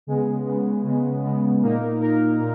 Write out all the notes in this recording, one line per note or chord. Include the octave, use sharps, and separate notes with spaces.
C#3 G#3 B3
C#3 G#3 B3
C#3 G#3 B3
C#3 G#3 B3
A#2 A#3 D#4 A#4
A#2 A#3 D#4 A#4
A#2